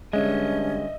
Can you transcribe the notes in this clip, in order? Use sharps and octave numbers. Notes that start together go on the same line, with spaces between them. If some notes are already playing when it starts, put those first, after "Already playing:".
G2 D3 G#3 C#4 D#5 E5